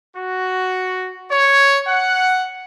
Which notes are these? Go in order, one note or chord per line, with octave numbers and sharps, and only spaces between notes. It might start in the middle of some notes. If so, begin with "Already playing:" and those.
F#4
C#5
F#5